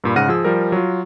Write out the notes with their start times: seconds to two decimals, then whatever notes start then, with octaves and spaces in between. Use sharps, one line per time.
0.04 G2 A#2 B5
0.16 G#2 C#3 F#5 F6 A#6 D#7
0.28 F3 G#4 E6
0.45 F3 G3 A#4
0.72 F#3 F4